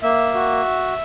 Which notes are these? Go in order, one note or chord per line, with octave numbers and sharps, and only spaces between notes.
A#3 E5
F#4